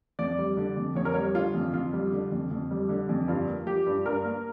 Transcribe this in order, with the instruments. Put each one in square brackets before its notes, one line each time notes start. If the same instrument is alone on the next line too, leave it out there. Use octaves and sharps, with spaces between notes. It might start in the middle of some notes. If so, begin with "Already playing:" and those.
[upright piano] F2 D5
G3
D3
F2
F2 C#5
A#4
G3 C#5
D3 F4
F2
F2 F4
G3
D3
F2
F2
G3
D3
F2
G2 F4
A#3
F3 G4
G2
G2 A#4
A#3